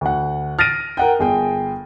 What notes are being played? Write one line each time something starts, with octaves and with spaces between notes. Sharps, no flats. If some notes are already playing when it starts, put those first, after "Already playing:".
D2 F#5
F6 A6 A#6 D7 D#7
A#4 F#5 G5
G1 G#4 G5